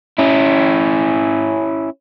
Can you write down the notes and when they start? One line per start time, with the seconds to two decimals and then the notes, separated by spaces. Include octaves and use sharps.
0.18 C#4 E4